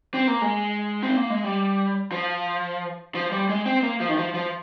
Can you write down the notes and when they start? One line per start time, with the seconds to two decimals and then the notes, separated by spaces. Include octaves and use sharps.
0.14 C4
0.28 A#3
0.42 G#3
1.03 C4
1.17 A#3
1.30 G#3
1.44 G3
2.12 F3
3.15 F3
3.32 G3
3.49 G#3
3.66 C4
3.83 A#3
4.00 F3
4.09 D#3
4.17 F3
4.34 F3